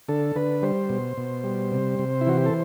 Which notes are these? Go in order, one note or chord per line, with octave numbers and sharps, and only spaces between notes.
D3 A4
D3 B4
G3 C5
B2
B2
G3
C3
C3
E4
E3 F#4
G4
A4